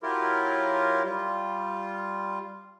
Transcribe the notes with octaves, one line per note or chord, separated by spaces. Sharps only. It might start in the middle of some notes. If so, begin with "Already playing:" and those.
F#3 E4 F4 G4 A#4
G3 F4